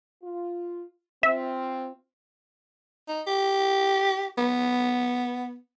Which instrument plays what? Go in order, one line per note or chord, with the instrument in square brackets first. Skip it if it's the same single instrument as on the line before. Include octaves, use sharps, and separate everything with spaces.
[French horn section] F4
[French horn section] C4 F4 [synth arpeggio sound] E5
[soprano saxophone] D#4
G4
B3